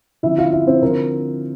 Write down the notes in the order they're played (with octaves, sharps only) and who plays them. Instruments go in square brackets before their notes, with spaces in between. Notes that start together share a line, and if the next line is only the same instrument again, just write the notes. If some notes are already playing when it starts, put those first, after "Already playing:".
[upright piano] D3 F3 C4 E4 E5
F4 F5
E4 E5
C4 C5
D3 F3 C4 A#4